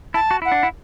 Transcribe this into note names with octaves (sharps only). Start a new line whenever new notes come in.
E4 A5
F#4
E4 F#5
D4
E4